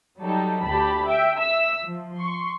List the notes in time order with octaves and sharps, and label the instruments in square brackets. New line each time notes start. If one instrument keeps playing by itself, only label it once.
[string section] F#3 G3 D#4 A4
D2 G4 A5 B5
E5 G5
E5 E6
F3
C6 C#6